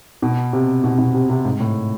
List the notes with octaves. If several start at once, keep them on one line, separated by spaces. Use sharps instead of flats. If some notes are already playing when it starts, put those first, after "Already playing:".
B2
C3
B2
B2
C3
C3
G#2
A2